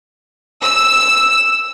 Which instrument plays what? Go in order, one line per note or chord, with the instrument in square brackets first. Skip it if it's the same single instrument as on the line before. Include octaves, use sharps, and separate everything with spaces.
[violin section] E6